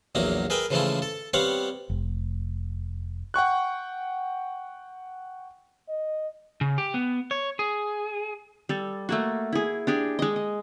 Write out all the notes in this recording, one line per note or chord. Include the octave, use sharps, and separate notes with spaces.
A#1 E2 F#3 A#3 A#5
G#4 A#4 B4 E5 G5
C#3 E3 F3 G#3 A3 E4
A4
G3 B3 C4 C#5 F5 F#5
F1
F#5 G5 C#6 F#6
D#5
C#3
G4
B3
C#5
G#4
G3 A4
A3 A#3 F#4
E4 G#4
D4 G4 G#4
G#3 D#5
D#5